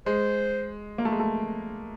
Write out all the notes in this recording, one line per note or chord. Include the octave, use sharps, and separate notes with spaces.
G#3 C5
A#3
A3
G#3
A3